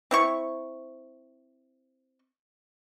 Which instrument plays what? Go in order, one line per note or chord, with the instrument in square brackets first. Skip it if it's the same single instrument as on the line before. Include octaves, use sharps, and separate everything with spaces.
[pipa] C4 E4 C#6